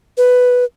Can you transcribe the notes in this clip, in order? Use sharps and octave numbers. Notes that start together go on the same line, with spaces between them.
B4